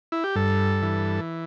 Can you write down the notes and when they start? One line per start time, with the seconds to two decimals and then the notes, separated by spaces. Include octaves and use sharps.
0.12 E4
0.24 G4
0.35 G2 A4
0.82 E3